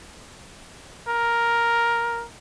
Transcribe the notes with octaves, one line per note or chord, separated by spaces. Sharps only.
A#4